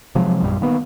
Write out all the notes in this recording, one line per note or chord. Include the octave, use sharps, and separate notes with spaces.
C3 F3 F#3 G#3
A#1 F#2 A#2 G3
D#3 A#3 B3